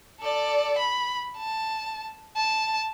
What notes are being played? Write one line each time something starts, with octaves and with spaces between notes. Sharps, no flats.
A4 D5
B5
A5
A5